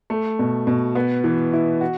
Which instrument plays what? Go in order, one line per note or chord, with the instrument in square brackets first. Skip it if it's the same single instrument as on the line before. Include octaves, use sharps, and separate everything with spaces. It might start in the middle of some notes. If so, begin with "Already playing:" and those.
[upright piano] A3
B2
B2
B3
E3
E4
F#4